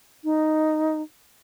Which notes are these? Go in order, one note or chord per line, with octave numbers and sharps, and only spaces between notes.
D#4